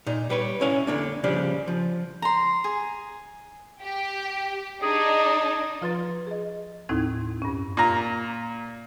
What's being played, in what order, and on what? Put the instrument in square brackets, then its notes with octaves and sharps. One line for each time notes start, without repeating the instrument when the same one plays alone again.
[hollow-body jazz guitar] A#2 D#4
G3 B4 C#5
C#4 E4 C#5 E5 F5 G#5
D3 A#3 D4
C#3 F3 G3 D4 G4
F3
[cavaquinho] A#5 C6
G#4
[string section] G4
[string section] D4 D#4 [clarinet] G#4
[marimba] F3 F4 B4 C6 A6
G#4 D#5
D#2 A2 C4 D#4 E4 G#6
G2 C#4
[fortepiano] A#2 A#5